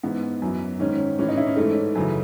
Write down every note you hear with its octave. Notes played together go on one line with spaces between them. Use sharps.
G#2 E3 B3
F#2 E3
G#2 D#3 C#4
A2 E3 C#4
D#4
E4
C#4
G#2 E3 A3
F#2 C#3 E3